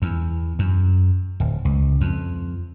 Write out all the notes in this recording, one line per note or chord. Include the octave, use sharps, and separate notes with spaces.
E2
F#2
D1
C#2
F2